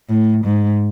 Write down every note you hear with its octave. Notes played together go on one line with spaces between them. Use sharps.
A2
G#2